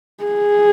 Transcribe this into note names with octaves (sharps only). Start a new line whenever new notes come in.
G#4